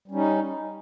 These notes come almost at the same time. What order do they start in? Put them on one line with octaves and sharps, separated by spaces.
G3 C#4 D#4